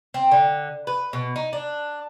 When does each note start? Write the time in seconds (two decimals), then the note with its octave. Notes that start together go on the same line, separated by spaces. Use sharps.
0.14 C4
0.31 D3
0.87 B4
1.13 B2
1.36 D#4
1.53 D4